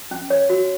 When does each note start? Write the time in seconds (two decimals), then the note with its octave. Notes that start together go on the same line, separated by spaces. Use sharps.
0.11 C#4
0.30 C#5
0.49 F#4